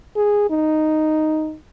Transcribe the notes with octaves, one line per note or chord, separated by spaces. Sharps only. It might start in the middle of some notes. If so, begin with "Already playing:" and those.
G#4
D#4